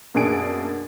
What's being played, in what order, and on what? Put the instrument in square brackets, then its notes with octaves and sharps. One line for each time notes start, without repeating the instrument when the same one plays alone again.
[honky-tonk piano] F#2 B2 A#3 D4 G#4 D7